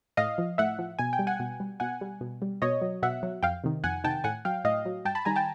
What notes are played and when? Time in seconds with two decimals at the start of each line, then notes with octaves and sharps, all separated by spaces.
0.17 A2 D#5 F5
0.38 F3
0.58 A2 E5 F#5
0.79 F3
0.99 B2 G#5
1.13 G5
1.19 G3
1.27 F#5 G#5
1.40 B2
1.60 G3
1.80 B2 F#5 G#5
2.01 G3
2.21 B2
2.42 G3
2.62 B2 C#5 D#5
2.82 F#3
3.03 B2 E5 F#5
3.23 F#3
3.42 F2 F5 G5
3.64 C3 D#3
3.84 F2 F#5 G#5
4.04 C3 D#3 G5 A5
4.24 A2 F#5 G#5
4.45 F#3 F5 G5
4.64 A2 D#5 F5
4.86 F#3
5.05 G2 G5 A5
5.15 A5 B5
5.25 D#3 G3 G#5 A#5
5.36 G5 A5